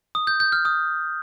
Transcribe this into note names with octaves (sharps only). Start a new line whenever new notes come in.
D#6
G6
G6
F6
D#6